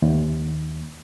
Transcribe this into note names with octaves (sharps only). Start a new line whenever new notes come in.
D#2